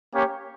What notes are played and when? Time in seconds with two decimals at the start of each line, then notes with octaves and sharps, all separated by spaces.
0.13 A#3 C#4 G4 C#5